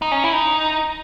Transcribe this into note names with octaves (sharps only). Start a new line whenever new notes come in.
D#4
C#4
E4
D#4